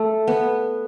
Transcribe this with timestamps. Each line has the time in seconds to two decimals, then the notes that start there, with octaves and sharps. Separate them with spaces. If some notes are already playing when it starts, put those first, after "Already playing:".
Already playing: A3
0.28 B3